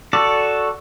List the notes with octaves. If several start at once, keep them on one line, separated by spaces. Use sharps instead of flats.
F#4 A4 D5